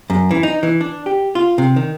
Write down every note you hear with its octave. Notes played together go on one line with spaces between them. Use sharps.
F#2
E3
D#4
E3
D4
G4
F4
C3
D#3